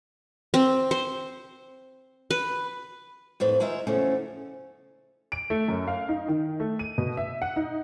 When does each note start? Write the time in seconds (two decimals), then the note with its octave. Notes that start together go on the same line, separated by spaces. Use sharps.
0.54 C4
0.91 C5
2.31 B4
3.40 F2 A2 C4 B4
3.60 D#3 G#3 F4 E5 A#5
3.87 E2 C#3 F3 A3 C#4
5.32 D7
5.50 A3
5.68 F#2
5.88 F5
6.09 D#4
6.28 D#3
6.60 A3
6.79 D#7
6.98 B2
7.17 E5
7.42 F#5
7.56 D#4